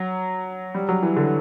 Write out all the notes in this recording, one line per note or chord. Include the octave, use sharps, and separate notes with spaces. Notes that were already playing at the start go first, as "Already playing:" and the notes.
Already playing: F#3
G3
F#3
E3
D3